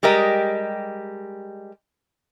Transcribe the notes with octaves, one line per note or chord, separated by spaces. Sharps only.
G3 G#3 G4 A#4 D#5